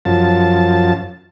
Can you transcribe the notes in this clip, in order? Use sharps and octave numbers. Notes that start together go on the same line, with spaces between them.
F#2 F3 A5